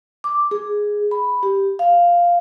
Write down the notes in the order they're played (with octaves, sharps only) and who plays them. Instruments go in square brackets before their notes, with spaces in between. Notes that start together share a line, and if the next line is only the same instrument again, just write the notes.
[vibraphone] D6
G#4
B5
G4
F5